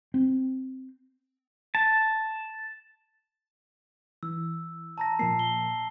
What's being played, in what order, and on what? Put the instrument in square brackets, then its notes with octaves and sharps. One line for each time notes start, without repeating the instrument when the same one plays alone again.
[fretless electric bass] C4
[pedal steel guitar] A5
[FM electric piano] E3 [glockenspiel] E6
[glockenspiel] A5 A#5 A#6
[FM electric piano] A#2 F3 A#3 [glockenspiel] A5 A#5 C7
[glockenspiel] G7